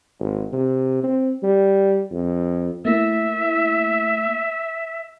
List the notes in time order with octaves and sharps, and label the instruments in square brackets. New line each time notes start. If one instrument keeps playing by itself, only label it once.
[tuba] G#1
C3
C4
G3
F2
[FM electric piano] A3 A#3 E4 [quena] E5